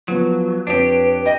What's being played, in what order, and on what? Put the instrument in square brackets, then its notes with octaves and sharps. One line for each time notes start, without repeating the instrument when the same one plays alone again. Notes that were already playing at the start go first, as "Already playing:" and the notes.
[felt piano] F3 B3 [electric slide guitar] F#3
[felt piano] F2 C#5 [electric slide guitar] D4 G4 [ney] B4
[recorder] D#5 [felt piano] G5 D#7